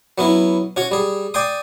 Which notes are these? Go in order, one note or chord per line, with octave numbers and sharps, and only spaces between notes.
F#3 B3 C#4 E4
C#4 F#4 C#5
G3 G#4
D5 G5 G#5 C6 D#6